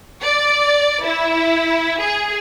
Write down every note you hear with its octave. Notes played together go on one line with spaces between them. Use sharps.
D5
E4
G#4